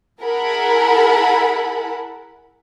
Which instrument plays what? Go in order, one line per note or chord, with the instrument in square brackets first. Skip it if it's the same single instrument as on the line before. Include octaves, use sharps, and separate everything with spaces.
[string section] E4 G#4 A#4 F#5 A5 B5